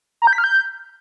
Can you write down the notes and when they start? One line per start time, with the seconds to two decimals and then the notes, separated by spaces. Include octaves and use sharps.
0.22 A#5
0.27 G6
0.33 B6
0.38 F6
0.44 G6